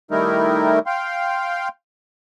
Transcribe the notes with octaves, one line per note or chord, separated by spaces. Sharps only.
D#3 G3 A3 D#4 E4 A#4
F5 G5 C6